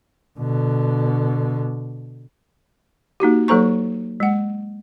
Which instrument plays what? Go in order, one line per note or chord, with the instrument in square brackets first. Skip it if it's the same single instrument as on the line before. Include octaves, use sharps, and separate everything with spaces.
[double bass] B2 D3
[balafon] A#3 D#4 F#4 G4
F#3 A#3 A4 C5 A#5 C#6
G#3 F#5